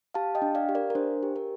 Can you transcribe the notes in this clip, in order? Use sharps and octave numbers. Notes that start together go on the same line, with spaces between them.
G4 F5 A5
D#5 G5
D4
D5 F5
G4
A#4 D5
A#4
D4 C5
G4
A#4